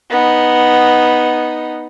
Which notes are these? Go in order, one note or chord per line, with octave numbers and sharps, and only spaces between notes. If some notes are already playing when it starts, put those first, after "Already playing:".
B3 D#4